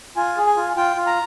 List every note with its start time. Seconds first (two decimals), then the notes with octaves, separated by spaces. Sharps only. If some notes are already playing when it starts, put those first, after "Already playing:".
0.16 F4 G#5
0.37 G#4
0.47 G#5
0.57 F4
0.76 F4 G5
0.96 F4
1.06 A#5